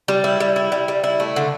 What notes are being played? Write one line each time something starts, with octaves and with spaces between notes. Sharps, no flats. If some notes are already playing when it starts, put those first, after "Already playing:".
G3
E4
G3
E4
G3
G3
E4
A3
D3